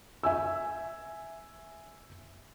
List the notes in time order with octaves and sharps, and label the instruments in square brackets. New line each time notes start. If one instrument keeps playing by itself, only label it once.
[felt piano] E5 G#5 E6